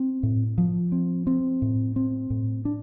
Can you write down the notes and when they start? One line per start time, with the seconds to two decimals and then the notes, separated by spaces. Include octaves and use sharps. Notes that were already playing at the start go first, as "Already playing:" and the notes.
Already playing: C4
0.23 A2
0.58 F3
0.92 C4
1.27 C4
1.62 A2
1.96 C4
2.30 A2
2.65 D4